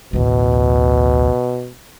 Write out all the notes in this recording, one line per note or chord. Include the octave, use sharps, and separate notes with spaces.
A1 D2 B2